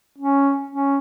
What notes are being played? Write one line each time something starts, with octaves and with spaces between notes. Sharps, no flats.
C#4
C#4